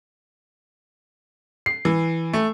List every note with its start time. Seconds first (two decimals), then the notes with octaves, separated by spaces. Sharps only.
1.66 C7
1.85 E3
2.33 A3